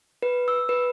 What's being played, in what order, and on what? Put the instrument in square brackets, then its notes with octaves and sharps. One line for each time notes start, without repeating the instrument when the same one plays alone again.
[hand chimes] B4
E6
B4